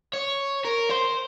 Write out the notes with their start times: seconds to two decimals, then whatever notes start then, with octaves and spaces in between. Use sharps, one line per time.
0.14 C#5
0.65 A#4
0.90 C5